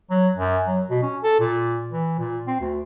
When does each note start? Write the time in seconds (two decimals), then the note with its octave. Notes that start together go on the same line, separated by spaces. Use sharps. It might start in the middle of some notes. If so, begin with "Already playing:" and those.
0.10 F#3
0.35 F#2
0.66 F#3
0.90 B2
1.02 C#4
1.23 A4
1.39 A#2
1.91 E3
2.19 A#2
2.47 C4
2.60 D2